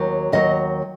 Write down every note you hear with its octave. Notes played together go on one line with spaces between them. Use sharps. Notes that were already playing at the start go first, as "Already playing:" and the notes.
Already playing: D#2 D#3 F#3
D#2 D#3 F#3 D#5